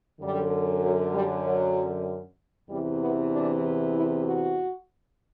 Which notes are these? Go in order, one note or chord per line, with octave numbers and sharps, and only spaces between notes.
F#2 D3 G3
F#3
G3
F#3
E2 C3 E3 G3
B3
D4
E4
F#4